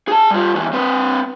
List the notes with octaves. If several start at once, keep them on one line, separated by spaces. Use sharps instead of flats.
G#4 A5
G3 F4
D#2 E3
C4 B4